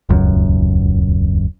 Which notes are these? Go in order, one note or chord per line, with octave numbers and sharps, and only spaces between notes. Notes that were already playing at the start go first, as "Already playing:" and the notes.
D#1 C#2 F#2